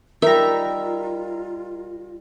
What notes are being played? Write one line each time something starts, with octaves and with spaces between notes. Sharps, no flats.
G3 D#4 F4 A#4 E5 A#5